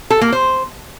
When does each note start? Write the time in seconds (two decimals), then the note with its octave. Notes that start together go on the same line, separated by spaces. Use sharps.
0.10 A4
0.21 A#3
0.32 C5